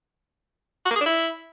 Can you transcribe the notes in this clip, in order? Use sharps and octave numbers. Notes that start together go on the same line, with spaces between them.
F#4
A#3
G#4
D4
E4